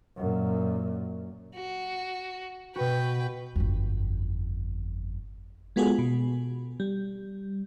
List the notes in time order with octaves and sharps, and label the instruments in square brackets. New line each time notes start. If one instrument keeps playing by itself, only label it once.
[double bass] F#2 A#2
[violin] F#4
[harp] B2 F#4 [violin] B4 G5
[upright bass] G1 F2
[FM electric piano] G#3 B3 F4 F#4 G#4 A4
B2
G3